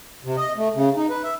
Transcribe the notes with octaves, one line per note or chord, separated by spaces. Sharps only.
C3
D#5
A3
C#3
D#4
B4
E5